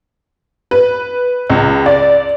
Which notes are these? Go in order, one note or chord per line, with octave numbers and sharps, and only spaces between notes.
B4
C#2
D5